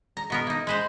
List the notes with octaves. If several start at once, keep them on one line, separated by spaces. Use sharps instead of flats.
A#5
B2 B3 A#4
A#3 D#4
G#3 B4 C5